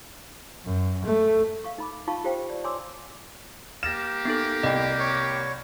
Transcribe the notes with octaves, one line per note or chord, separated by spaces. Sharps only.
F#2
A3
F5 C#6
D#4 B5 D6
D#4 F4 F5 A5 B5 C#6
F4 G4 C5 F5 G5
D5
C#5 G#5 C6 D6 E6
A#3 G4 F6 A6 A#6 E7
B3 D#4 A4
C2 D#5 G5
C#5 C#6